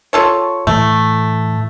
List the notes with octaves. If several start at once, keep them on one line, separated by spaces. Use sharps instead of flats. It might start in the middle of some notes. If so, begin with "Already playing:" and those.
F4 A4 C#5
A2 E3 A3